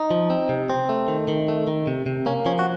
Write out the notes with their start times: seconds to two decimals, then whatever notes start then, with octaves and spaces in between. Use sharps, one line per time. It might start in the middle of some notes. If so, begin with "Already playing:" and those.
Already playing: D#4
0.11 F3
0.30 C4
0.49 C3
0.70 C4
0.89 A3
1.08 D#3
1.28 D#3
1.48 A3
1.67 D#3
1.87 C3
2.06 C3
2.26 A#3 C#4
2.46 F3 C#4
2.59 F#4